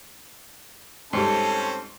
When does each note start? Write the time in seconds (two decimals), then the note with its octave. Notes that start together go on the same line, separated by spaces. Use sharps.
1.13 G#2 G3 C4 C#4 A4 C5